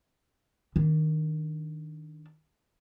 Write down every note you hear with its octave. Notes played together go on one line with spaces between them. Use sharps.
D#3 D4